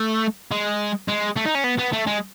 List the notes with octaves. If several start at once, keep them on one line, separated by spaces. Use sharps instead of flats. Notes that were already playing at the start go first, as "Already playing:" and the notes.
Already playing: A3
G#3
G#3
A3
D#4
C#4
B3
B3
A3
G#3